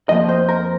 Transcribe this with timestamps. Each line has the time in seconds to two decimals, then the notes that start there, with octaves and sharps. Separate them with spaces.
0.09 F2 F3 A#3 D#5
0.29 C5
0.49 A#4